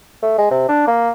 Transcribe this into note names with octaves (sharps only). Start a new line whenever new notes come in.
A3
G#3
C3
D4
A#3